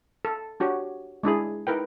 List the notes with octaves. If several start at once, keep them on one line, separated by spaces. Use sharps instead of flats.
A4
D4 F#4 G4 C#5
G#3 D4 E4 G#4
D#4 E4 A#4 B4 G5